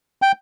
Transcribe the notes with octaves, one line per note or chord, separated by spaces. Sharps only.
G5